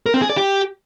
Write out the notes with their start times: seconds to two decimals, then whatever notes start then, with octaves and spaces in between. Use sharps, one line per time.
0.06 A#4
0.14 C4
0.22 G#4
0.29 D5
0.37 G4